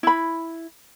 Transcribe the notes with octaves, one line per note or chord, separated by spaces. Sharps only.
E4 B5